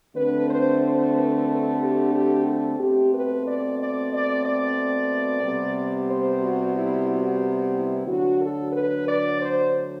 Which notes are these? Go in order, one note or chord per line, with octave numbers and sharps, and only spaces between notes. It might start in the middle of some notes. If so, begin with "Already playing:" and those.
D2 D3 A3 C4 B4
C5
C5
B4
A4
G4
G4
A4
B2 A3 C4 G4
B4
D5
D5
D5
D5
C3 G3 B3
C5
F#4
E4
F#4
E4
D2 D3 F#3 F#4
A4
B4
D5
C5